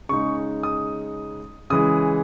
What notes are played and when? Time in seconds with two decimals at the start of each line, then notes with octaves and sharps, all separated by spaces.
0.09 C#3 G#3 D#4 C#6
0.63 D#6
1.70 C#3 E3 G#3 D#6